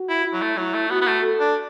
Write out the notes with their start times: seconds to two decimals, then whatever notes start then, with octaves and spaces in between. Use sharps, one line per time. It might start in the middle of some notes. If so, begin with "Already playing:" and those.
Already playing: F#4
0.09 E4
0.25 E4
0.33 F#3
0.42 A3
0.57 F#3 E4
0.74 A3
0.90 B3 F#4
1.01 B3
1.07 A3
1.23 A4
1.40 D4